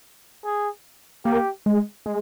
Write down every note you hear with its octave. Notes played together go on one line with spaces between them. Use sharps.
G#4
A#3 G4
G#3
G#3